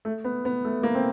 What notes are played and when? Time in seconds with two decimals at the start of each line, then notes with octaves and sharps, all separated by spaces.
0.05 A3
0.24 B3
0.45 B3
0.65 A3
0.83 A#3
0.95 C4